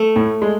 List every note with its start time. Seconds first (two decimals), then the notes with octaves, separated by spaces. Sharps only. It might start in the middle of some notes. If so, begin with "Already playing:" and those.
Already playing: A3
0.16 A2
0.42 G#3